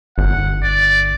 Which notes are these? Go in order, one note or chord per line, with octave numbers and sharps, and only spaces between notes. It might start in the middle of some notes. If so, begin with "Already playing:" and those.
G1 F#5
D5